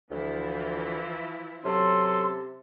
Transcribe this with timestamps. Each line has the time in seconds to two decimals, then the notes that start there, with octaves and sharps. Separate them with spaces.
0.11 D2 E3 F3 E4
1.65 C3 F#3 C#4 A4 C6